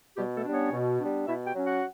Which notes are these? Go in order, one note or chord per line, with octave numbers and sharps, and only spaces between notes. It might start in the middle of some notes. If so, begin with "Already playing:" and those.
B2 G3 G4
A3 A4
G3 B3 D4
C#4 C#5
B2
G3 B3 D4
B2 E4 E5
G4 G5
F#3 C#4
F#4 F#5